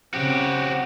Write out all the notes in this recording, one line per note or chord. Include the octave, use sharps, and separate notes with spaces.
C#3 C4 F#4 G4